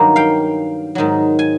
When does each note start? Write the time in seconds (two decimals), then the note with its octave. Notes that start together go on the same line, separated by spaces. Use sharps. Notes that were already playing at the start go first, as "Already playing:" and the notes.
Already playing: G2 D#3 F#3 A#3 A#5
0.16 F5 G5
0.95 G#2 D#3 F#3
1.39 G#5